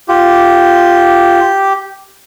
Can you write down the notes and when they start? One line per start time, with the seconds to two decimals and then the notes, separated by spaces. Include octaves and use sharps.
0.08 F4 G4